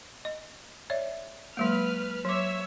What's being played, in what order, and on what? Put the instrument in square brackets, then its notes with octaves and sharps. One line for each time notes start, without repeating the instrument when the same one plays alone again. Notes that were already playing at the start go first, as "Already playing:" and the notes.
[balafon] D#5
C#5 D5 E5
[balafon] F#3 G#3 A#3 [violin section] B4 F6
[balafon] F#3 D6 [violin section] C#5 E5 E6